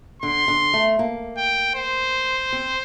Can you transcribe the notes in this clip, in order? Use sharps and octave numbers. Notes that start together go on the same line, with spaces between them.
D3 C6
D3
A3
A#3
G5
C5
C4